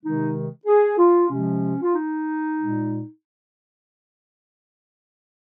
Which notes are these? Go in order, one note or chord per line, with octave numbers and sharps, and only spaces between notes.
C3 D#3 G#3 D#4
G#4
F4
C3 F3 G#3 C#4
F4
D#4
A#2 G#3